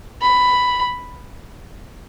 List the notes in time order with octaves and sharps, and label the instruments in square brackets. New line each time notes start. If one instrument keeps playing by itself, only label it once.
[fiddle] B5